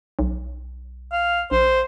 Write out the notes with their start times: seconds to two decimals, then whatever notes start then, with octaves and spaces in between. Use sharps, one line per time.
0.19 B1
1.12 F5
1.51 A#1 C5